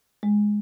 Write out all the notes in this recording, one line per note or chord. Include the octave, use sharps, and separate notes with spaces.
G#3